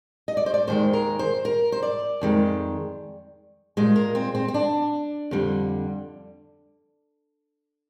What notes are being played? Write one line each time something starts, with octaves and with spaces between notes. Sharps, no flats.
D#5
D5
C5
D5
D#2 D#3 G#3 C5
A#4
C5
A#4
C5
D5
F2 D#3 G#3
A#2 G#3 C5
A#4
C4
C4
C4
D4
F2 D3 G3